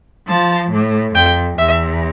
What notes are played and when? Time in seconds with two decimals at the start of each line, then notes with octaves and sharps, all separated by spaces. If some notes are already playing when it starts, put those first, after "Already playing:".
0.28 F3 A5
0.71 A2
1.15 F2 G5
1.58 E2 E5